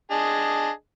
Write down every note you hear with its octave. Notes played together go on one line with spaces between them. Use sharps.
D4 G#4 D#5